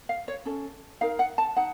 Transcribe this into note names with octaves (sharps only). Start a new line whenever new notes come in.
F5
C#5
C#4 A4
D#4 A#4 F5
F#5
A5
D#4 F#5